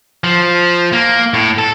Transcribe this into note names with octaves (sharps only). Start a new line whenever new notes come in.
F3
A#3
A2
A4